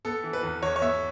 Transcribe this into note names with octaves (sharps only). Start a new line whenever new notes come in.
B3 A4
E3
B4
E2
E2 C#5
C#5
B3 E5